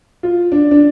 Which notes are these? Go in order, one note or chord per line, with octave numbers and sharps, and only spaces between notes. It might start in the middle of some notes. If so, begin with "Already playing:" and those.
F4
D4
D4